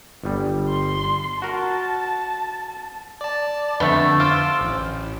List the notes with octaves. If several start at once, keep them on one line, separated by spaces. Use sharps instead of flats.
G1 G3
C6
F#4 A#4 A5
D5 A5
F2 D3 A3 B3
F4 C5 D6 E6
A1